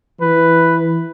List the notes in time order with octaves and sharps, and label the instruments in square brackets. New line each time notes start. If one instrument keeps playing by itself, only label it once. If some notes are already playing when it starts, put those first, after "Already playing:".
[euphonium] E3 [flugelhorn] B4